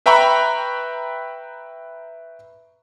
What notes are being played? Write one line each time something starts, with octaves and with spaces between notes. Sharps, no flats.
B4 E5 G5 A#5 B5 C#6